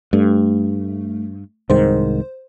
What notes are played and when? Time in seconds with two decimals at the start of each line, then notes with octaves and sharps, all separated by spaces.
0.13 G2 A3
1.70 C2 G#2 D#3 C5